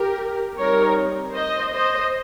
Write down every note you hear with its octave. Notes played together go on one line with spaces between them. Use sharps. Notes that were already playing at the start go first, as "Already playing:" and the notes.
Already playing: G4 A#4
G3 C4 D#4 A#4 C#5
C5 D#5
C5 D#5